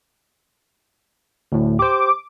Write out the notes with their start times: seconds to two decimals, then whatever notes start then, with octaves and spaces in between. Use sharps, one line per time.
1.52 D2 A2
1.79 G4 C5 D6